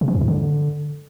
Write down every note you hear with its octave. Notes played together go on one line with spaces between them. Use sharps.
C3
E3
F2
G#2
D3